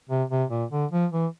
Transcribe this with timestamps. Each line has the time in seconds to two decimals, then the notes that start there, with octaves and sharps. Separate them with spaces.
0.09 C3
0.30 C3
0.50 A#2
0.71 D3
0.92 F3
1.12 E3